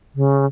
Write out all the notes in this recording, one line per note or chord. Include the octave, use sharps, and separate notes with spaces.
C#3